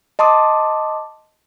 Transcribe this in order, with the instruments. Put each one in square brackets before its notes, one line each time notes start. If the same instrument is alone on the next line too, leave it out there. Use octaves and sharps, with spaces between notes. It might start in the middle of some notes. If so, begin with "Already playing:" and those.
[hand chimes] D#5 A5 C6 D6 D#6